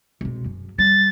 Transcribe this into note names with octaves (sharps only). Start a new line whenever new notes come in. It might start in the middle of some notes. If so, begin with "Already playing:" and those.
E1 C3
F#2
G3 A6